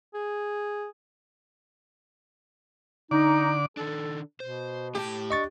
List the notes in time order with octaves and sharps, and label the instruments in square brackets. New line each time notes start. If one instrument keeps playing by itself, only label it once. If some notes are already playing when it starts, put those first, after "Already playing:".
[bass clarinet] G#4
[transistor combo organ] D3 D5 D6 [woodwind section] D#4
[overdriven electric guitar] D#3 D4 [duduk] A4
[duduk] B2 [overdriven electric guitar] C5
[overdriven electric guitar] A2 A5 [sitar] G4
[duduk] D4 [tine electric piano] D#5 C#6 A6